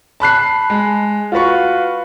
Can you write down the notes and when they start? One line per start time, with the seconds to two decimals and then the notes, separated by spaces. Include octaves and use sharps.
0.20 A5 B5 F#6 C7
0.70 G#3
1.32 F4 F#4 B4 C#6